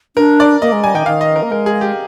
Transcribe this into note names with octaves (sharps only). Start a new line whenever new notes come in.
D4 A#4
D5
A#3 D#5
G#3
G3 G#5
D#3 G5
D#3 F5
D#5
A#4
A#3
G#3 A#4
G#4
G4